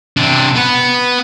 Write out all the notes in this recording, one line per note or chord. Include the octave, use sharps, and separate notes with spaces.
C3 D4
B3 B4